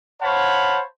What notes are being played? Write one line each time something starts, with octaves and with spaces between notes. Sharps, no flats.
C5 C#5 F5 F#5 A5 B5